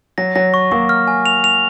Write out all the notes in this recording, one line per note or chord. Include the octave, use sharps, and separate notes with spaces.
F#3 A#6
F#3 A#6
C#6
F#3 A#3 C#6
F6
G#5
F7
F7